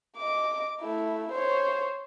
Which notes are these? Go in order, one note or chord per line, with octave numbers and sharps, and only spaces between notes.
D#5 D6
A3 E4
C5 C#5